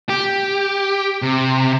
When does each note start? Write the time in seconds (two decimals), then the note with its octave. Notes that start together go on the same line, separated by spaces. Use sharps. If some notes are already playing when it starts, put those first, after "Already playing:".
0.09 G4
1.22 C3